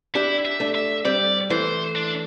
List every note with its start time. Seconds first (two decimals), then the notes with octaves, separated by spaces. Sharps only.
0.15 D4 E4 G4
0.45 E5
0.60 A3 D4
0.75 E5
1.05 G3 C4 D5
1.50 E3 A3 C5
1.95 D4